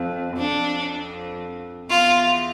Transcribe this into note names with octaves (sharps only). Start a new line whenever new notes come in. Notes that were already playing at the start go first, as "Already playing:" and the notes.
Already playing: F2
F2 D4
E2 F4